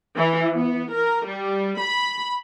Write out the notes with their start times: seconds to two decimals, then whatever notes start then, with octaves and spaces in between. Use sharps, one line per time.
0.16 E3
0.55 B3
0.93 A#4
1.26 G3
1.80 B5